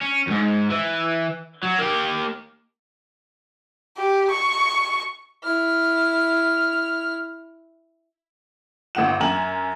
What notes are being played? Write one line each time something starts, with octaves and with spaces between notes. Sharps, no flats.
C#4
F2 G#2
E3
F#3
A#3 G4
G4
C#6
E4 F6
G1 F#5 E7
F#2 G#5 A#5 E7 F#7